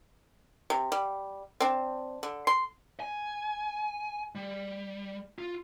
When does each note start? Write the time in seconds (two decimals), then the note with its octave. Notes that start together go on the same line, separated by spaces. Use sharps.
0.70 C3
0.92 G3
1.60 C4 D4
2.23 D3
2.47 C6
3.00 G#5
4.35 G3
5.39 F4